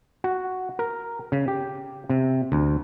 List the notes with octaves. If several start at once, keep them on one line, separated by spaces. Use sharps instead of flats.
F#4
A#4
C#3
G4
C3
D2